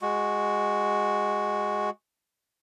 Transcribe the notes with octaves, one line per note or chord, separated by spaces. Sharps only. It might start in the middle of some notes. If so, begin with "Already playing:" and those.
G#3 F#4